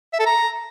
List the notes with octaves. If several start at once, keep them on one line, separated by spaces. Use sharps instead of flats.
E5
A4
A#5